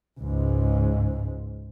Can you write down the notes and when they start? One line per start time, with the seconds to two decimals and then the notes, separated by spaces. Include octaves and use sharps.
0.20 C#2 G#2